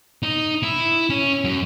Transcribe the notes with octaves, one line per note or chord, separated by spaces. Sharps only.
D#4
E4
C#4
F#2